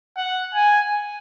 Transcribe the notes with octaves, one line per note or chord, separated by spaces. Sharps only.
F#5
G#5